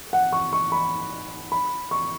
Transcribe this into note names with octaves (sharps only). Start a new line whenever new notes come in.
F#5
C#6
C#6
B5
B5
C#6